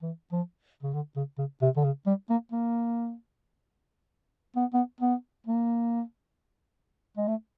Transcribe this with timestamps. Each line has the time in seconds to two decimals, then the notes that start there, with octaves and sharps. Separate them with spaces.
0.02 E3
0.33 F3
0.83 C#3
0.94 D3
1.16 C#3
1.38 C#3
1.62 C3
1.77 D3
1.84 C#3
2.07 G3
2.30 A#3
2.52 A#3
4.56 B3
4.74 B3
5.01 B3
5.47 A#3
7.17 G#3
7.28 A3